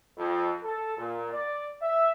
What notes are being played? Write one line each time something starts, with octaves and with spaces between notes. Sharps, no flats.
F2
A4
A#2
D5
E5